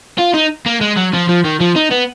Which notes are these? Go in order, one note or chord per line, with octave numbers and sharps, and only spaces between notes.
F4
D#4
A#3
G#3
F#3
F3
F3
D#3
F3
D#4
B3